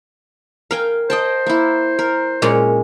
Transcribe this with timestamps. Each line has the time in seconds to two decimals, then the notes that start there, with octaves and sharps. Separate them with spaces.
0.71 A#4 F5 G5 G#5
1.10 C5 D#5 G5 A5
1.47 A#3 E4
1.99 A#4
2.42 A#2 G#3 C#4